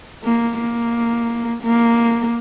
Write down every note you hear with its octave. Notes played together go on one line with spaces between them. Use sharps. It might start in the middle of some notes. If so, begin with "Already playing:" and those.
A#3
A#3
A#3